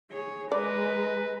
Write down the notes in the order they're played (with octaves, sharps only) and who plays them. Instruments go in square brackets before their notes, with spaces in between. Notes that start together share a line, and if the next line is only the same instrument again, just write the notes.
[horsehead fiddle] G#4 C#5
[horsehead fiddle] G#3 A#4 [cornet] B4 [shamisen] D5